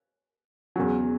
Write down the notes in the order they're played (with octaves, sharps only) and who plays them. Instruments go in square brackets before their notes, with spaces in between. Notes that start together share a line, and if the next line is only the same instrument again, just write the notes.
[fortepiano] E2 C#3 F#3